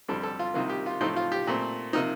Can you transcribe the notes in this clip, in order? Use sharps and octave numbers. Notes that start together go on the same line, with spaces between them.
F2 D3 G3 C4 A4
A4
F4
C2 C3 D#3 A#3 F4
G4
F4
A2 F3 A3 C4 D#4
F4
G4
A#2 A3 C4
C3 F3 A#3 D#4